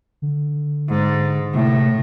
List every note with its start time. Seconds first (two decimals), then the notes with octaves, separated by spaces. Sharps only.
0.22 D3
0.89 G#2
1.54 A2 C3
1.87 B2